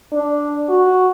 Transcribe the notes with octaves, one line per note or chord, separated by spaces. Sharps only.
D4
F#4